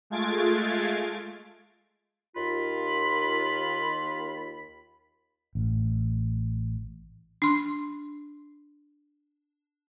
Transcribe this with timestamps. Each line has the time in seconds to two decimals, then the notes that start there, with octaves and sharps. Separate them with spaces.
0.10 G#3 A3 F4 G#6 A6 D7
2.36 D#2 F4 B5
5.55 A1
7.42 D4 C6